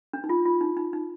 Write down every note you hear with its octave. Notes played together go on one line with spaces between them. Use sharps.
D4
D#4
F4
F4
D#4
D#4
D#4